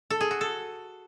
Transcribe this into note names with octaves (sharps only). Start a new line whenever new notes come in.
A4
G#4
F#4
A4